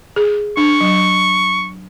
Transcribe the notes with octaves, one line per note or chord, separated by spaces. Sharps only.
G#4
D4 C#6
F#3